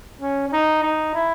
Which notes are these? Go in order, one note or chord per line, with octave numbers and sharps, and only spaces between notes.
C#4
C#4
D#4
D#4
E4